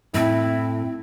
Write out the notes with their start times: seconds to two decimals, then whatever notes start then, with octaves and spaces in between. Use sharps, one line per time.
0.14 A2 C4 E4